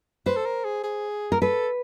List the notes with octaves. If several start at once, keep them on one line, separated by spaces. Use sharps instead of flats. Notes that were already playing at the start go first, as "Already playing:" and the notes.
B4 C5
A4
A#4
G#4
G#4
A#4
A4 B4